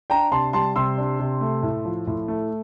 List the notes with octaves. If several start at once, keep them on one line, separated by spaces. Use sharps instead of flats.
D4 G5 A#5
C3 A5 C6
G3 A5 C6
C3 C6 E6
D4
C3
A3
A2
F3
A2
A3